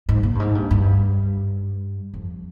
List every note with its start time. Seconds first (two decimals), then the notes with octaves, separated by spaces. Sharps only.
0.09 G#2
0.23 A#2
0.35 G2
0.40 G#2
0.55 G2
0.71 G2
2.14 F2